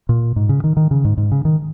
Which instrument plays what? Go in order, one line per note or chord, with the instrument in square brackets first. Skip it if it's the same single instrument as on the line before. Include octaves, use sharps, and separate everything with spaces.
[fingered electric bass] A#2
G#2
C#3
D#3
D#3
C#3
G#2
G#2
C#3
D#3